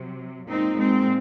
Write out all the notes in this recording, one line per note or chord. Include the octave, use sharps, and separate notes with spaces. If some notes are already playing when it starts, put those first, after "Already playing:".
Already playing: C3 F#3
A#2 G#3 C4 D#4
G#3 C4